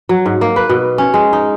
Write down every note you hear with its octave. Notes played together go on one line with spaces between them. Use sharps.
F#3
G#2
A#3
B4
B2
C#4
G#3
D#4